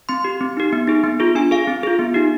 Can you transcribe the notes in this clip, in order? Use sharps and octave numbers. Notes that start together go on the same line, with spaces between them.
C4 C6
G4
C4
D#4 G4
B3
D#4 G#4
B3
F4 G#4
D4 G#5
G#4 F5
C4
F4 G#4
B3
D#4 G4